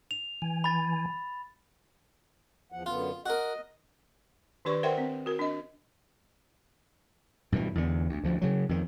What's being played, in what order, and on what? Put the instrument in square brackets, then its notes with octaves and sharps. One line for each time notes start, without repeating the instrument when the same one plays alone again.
[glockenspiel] F7
[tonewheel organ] E3 G#5
[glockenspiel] B5 A6
[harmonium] E2 F3 F#5
[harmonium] F#2 D3 B3 [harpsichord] F4
[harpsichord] F#4 A#4 [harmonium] D#5
[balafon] D#3 D4 G4 B4 D5 C#6
A#4 C5 E5 F#5 G5 C6
C4
F#4 A#4
D4 D#5
[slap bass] G2 B2 D#3 E3
E2 D3
D2
D2 F3
C#3 F#3
F2 D#3